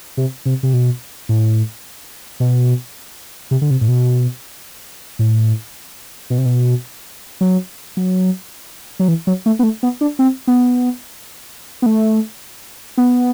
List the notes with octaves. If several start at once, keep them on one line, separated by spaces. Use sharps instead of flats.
C3
C3
C3
B2
A2
B2
C3
D3
C3
A2
B2
A2
B2
C3
B2
F#3
F#3
F#3
E3
F#3
A3
B3
A3
B3
D4
C4
B3
B3
A3
B3